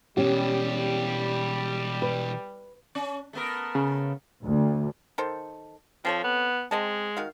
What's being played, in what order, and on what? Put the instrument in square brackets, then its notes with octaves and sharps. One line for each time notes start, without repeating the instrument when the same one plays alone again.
[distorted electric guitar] B2 E3 [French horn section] G3 [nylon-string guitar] C#4 G4
[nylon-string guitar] B4
[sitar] C#4
A3 B3 A#4
[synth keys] C#3
[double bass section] D2
[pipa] D#3 A4 C5
[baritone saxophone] F3 [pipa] C4 A4 C#5
[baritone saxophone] B3
[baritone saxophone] G#3 [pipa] C4 D#5 A5
[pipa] D#3 F#4 F5